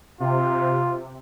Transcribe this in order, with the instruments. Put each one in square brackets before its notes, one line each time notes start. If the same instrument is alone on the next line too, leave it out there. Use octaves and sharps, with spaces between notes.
[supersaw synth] C3 [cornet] F4